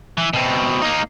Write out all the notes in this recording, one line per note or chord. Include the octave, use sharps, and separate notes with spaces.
E3
B2 C4
A#3 D#4